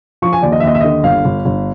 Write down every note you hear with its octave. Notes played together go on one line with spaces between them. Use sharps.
F3 C#6
G#5
D#2 D5
D#5
E5
D#2 D#5
E5
D3 D#5
G1 F5
G1
G1